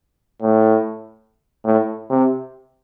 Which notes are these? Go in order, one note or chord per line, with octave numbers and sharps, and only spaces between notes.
A2
A2
C3